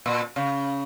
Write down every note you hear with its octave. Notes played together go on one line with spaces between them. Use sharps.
A#2
C#3